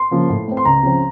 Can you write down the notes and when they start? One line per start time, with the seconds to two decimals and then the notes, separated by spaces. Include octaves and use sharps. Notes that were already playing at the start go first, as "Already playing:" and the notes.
Already playing: C6
0.11 C#3 F3 A#3
0.30 A2
0.48 A3 C4
0.57 C6
0.65 C#2 A#5
0.83 C#3 F3 C4